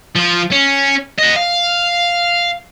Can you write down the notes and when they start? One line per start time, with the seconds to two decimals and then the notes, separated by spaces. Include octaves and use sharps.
0.16 F3 F4
0.52 C#4
1.19 D#5 F#5
1.36 F5